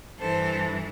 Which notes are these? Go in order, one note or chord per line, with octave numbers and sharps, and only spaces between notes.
G2 E3 A4 C5